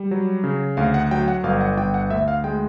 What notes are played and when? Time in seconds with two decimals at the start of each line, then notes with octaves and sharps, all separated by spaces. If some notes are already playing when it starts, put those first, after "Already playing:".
Already playing: G3
0.11 F#3
0.44 C#3
0.77 D2 F5
0.94 F#5
1.11 F#3 G5
1.28 F#5
1.44 G1 F5
1.61 F#5
1.77 G1 G5
1.94 F#5
2.10 D2 E5
2.28 F5
2.44 G#3 G5